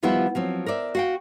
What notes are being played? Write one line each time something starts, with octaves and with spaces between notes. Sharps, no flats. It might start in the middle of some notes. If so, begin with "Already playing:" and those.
D#3 F3 G3 B3 E4 F4
F3 F#3 C4
A#4 C5 D5 E5
F#4 F5 G5